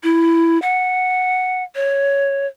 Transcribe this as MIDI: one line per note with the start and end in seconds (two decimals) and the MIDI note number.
0.03 0.60 64
0.62 1.63 78
1.75 2.47 73